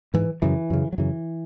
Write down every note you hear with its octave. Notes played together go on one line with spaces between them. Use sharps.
G#2 E3
F#2 C#3 E3
F#2 C#3
F#3
F#2 C#3 E3